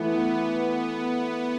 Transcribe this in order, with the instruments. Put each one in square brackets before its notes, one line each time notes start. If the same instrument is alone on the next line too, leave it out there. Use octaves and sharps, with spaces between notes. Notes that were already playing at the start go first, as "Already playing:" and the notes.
Already playing: [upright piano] E3 A3 E4 [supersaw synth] B3
[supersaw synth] B3